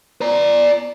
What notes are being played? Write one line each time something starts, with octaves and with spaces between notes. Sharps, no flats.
D5 A#5